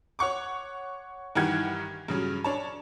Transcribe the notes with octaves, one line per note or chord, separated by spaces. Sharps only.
C#5 F#5 C#6 D6
G2 D#3 E3 G4 F#5 G#6
G2 C#3 F#3
D4 C#5 A5